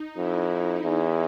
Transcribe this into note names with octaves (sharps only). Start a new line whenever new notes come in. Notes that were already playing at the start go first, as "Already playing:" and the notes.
Already playing: D#4
F2 E4
E2